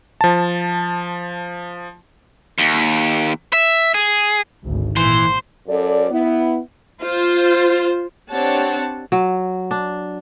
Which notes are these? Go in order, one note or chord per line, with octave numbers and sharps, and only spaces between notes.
F3 A5
D#2
E5
G#4
G#1 D2
A#2 E3 C5
F#2 A4 D5
B3 E4
F4 C5
C4 D4 G4 C#5 F#5 A5
F#3
D4